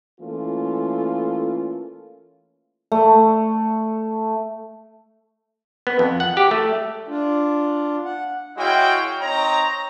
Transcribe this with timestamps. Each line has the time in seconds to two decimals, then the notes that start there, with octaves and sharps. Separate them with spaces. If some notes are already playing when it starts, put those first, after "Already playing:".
0.20 E3 A3 A#3 C#4 F4 A4
2.92 A3
5.87 B3
5.99 F2
6.20 F#5
6.37 G4
6.51 A3
7.08 D4 F4
8.05 F#5
8.58 G#3 E4 F#4 C#5 F5 G5
9.21 C4 D#4 C#5 A#5